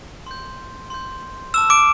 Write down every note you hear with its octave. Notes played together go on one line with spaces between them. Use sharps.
C6 G6
C6 G6
A5 D6 E6 F6 E7
D6 D7